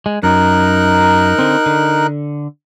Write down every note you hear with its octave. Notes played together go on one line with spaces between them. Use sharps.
G#3
F#2 D#4 A#4 F#6
D3 C4
D3